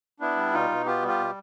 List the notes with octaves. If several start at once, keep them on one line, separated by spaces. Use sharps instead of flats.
B3 D4 E4
G3
B2 D#4 F4
B2
B3 F4 G4
G3
F4 G4
B2